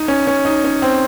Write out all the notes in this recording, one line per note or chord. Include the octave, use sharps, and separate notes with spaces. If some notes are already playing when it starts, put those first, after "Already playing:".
Already playing: D#4
C#4
C#4
D#4
C#4
C4